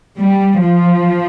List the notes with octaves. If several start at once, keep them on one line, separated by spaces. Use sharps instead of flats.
G3
F3